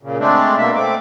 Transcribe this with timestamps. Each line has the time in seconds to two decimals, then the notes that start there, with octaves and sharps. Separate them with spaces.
0.03 A#2 C#3
0.19 G#3 A3 C4 D4
0.58 B2 A#3 E5
0.76 A3 C4 D6